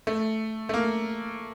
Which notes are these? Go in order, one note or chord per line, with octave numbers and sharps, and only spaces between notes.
A3
A3
A#3